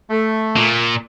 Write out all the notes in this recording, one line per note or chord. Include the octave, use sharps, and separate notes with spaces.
A3
A#2